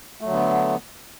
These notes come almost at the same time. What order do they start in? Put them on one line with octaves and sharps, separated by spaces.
A3 F#3 D3 B3